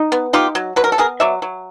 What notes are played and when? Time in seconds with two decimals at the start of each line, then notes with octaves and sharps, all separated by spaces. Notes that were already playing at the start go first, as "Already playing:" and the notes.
Already playing: D#4
0.12 B3
0.33 D#4 F4 G4
0.55 F#3
0.76 F#3 B4
0.84 A#4
0.92 A4
0.98 B3 G#4 A#4
1.20 F#3 D5 E5
1.42 F#3